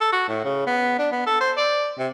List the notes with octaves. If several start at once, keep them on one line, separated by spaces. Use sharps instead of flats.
A4
F#4
A2
C#3
B3
D4
B3
A4
C5
D5
C3